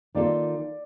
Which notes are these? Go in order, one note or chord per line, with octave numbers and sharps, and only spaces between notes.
D#3 A#3 F4 A4 D5